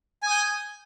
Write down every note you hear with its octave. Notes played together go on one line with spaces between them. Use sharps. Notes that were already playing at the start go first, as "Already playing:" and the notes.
G#5 D#6 G6